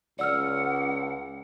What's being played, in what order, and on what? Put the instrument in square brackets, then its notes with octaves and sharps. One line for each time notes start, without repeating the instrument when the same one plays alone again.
[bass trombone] C#2 [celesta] D5 E6 F6 [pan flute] F#5